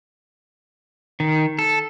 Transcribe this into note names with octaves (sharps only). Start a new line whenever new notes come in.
D#3
A4